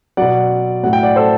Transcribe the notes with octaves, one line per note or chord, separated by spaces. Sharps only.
B2 F#3 D5 F#5
A2 F#3 F#5
G5
D5 F#5
A4 C5